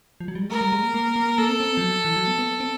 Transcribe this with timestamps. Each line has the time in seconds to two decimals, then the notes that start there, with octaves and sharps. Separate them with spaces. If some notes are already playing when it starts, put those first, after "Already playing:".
0.20 F3
0.28 F#3
0.35 G3
0.43 G#3
0.50 A3 A#4
0.61 G3
0.72 G#3
0.83 A#3
0.94 A#3
1.16 A#3
1.38 A#3 A4
1.49 C4
1.60 C4
1.72 B3
1.77 F3
1.82 F#3
2.05 E3
2.16 F#3
2.27 B3
2.39 B3
2.60 C4